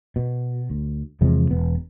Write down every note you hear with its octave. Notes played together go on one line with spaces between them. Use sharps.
B2
D2
E2 C3 F3 G#3
E1 B3